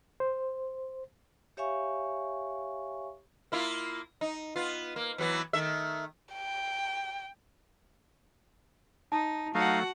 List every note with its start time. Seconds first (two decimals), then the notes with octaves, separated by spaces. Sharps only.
0.20 C5
1.57 G4 C#5 E5 F5 G#5 C#6
3.52 A#3 E4 F4
4.21 D#4
4.56 B3 F4
4.96 A#3
5.18 E3 F#3 B3
5.53 D#3 A3 E5
6.33 G5
9.12 D#4 A5
9.55 F#3 A3 D#4 F#4 D#5 F5 F#5